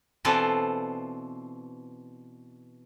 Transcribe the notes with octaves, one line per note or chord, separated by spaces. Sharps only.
B2 E3 C4 D4 F4 A4